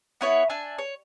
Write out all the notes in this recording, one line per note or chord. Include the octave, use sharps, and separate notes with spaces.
B3 E4 C#5
D4 E5 G#5 A5
C#5